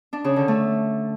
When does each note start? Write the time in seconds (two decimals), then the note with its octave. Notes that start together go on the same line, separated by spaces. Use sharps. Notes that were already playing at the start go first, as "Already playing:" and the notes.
0.13 D4
0.24 C#3
0.36 D3
0.48 A3